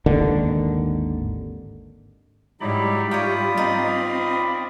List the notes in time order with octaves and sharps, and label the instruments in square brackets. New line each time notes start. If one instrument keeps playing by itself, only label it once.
[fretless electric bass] G#1 D#2 D3 D#3
[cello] G#2 G3 [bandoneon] F#3 D#4 E4 [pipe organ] D5 B5
[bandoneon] F4 D#6 [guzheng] C#5 G5
[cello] C4 [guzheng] D#4